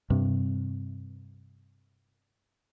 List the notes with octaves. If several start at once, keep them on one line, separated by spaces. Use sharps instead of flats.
G2 C3